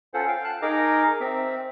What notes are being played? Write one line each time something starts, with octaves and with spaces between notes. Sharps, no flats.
C#4 F4 A4 C5 F#5
F5 G5
A5 F#6
D#4 G#4 A#4 D#5 A#5 D6
C4 E5